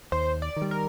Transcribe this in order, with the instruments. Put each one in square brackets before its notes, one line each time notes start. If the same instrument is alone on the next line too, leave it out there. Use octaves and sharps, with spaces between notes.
[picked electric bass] D#2 [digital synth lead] C5
[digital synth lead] D5
[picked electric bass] D#3
G3
[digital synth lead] A#4